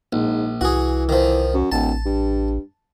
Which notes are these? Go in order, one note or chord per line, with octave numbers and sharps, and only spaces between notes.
A#1 G#2
C2 E3 F#4 G#4
D#3 F3
F#2
D1 A1 A5
G2